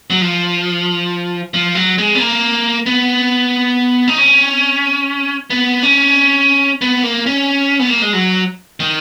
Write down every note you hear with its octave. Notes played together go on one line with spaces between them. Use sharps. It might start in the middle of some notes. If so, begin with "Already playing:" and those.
F#3
F3
F3
F#3
G#3
B3
A#3
B3
D#4
C#4
B3
C#4
B3
A#3
C#4
B3
A#3
G#3
F#3
D#3